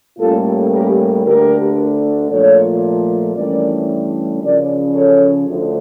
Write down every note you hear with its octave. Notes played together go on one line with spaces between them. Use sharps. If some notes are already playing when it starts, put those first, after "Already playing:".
A2 G3 A#3 C#4 F4 A4
G4 A#4
D2 D3 A3 D4 G4 A#4
A#2 F3 A3 A4 C#5
G2 E3 A3 C#4 A#4 D5
C#3 F3 C#4 A#4 D5
A4 C#5
D2 D3 F3 A3